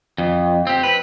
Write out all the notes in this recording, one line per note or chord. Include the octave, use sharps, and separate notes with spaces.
F2
C4 G4
B4